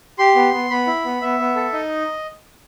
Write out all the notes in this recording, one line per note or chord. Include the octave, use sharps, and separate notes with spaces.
G4 C6
B3
B3
B3 B5
E4
B3
B3 E5
B3
A4
D#4 D#5